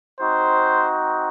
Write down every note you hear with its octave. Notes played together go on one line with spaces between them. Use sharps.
C4 D#4 F#4 C5